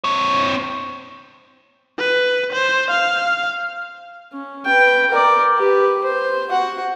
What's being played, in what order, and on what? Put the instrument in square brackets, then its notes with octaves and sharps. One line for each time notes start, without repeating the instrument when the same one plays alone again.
[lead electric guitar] C4 C#5
[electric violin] B4
C5
F5
[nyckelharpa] C#4
B4 G5
A#4 D5
G4 B4
C5
F#4 F#5